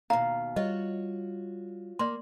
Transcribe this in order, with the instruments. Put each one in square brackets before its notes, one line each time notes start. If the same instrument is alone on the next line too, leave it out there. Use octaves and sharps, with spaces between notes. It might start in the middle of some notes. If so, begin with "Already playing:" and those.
[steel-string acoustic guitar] D#2 B2 [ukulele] F5 [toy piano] A#5
[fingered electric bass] G3 [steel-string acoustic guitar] F4 F#4 C#5 [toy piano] D#5
[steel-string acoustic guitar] A#3 [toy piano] D5 C6